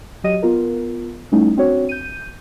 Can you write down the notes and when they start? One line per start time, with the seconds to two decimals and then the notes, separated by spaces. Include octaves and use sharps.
0.24 F#3 G4 D#5 D#7
0.42 B3 F4 A#4
1.32 G3 A3 C#4 D#4 E4
1.57 C4 D4 F#4 C#5
1.89 G6 D#7